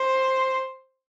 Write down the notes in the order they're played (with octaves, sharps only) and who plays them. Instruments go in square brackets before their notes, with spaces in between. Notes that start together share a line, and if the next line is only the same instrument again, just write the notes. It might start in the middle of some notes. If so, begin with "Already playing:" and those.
Already playing: [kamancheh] C5